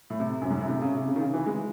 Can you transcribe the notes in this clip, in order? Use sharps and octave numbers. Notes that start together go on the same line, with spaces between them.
A2
C3
F#2
G#2
A2
C3
C#3
C3
C#3
D#3
C#3
E3
G#3